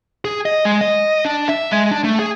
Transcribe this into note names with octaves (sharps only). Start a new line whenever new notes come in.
G#4
D#5
G#3
D#5
D4
E5
G#3
D4
A3
G#4